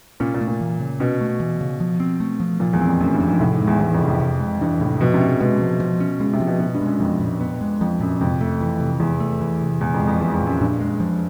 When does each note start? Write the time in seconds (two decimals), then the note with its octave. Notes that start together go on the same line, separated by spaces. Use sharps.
0.20 A#2 C#4
0.34 A#2
0.41 A3
0.47 A#2
0.61 E3
0.80 C#3
1.00 B2 C#4
1.21 A3
1.40 E3
1.61 C#3
1.80 F3
2.00 C4
2.20 A3
2.40 F3
2.60 A#2 F3
2.73 E2
2.81 C4
2.88 F2
3.01 F#2 A3
3.14 G2
3.20 F3
3.27 G#2
3.40 A2 C3
3.54 G#2
3.61 G#3
3.67 E2
3.80 E2 E3
3.94 F2
4.01 C3
4.08 F2
4.20 C3
4.40 G#3
4.61 G2 E3
4.80 A2 C3
5.01 B2 F3
5.14 C3
5.21 C#4
5.28 C#3
5.40 B2 G#3
5.61 F3
5.80 F3
6.00 C#4
6.20 C#3 G#3
6.33 C3
6.40 F3
6.47 B2
6.60 B2 B3
6.74 G2
6.81 G#3
6.87 F#2
7.00 F2 F3
7.20 A#2
7.40 B3
7.61 G#3
7.81 F2 F3
8.00 F#2 A#2
8.21 F2 C3
8.41 A3
8.61 E3
8.80 C3
9.00 E2 C3
9.20 A3
9.41 E3
9.61 C3
9.80 E2 A#2
9.94 F2
10.00 G#3
10.07 F2
10.20 E2 F3
10.34 F2
10.41 A#2
10.47 F#2
10.60 G2 A#2
10.80 G#3
11.00 F3